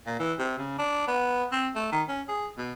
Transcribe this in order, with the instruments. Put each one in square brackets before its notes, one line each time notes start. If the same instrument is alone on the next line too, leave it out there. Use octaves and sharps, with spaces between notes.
[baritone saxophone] A#2
E3
C3
C#3
D4
B3
C4
A3
D#3
C#4
G#4
B2